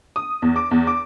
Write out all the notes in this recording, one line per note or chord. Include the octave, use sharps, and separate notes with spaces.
D#6
E2
D6
E2
D6